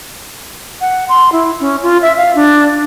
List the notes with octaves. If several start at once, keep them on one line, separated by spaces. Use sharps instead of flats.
F#5
C6
E4
C#4
F4
E5
F5
D4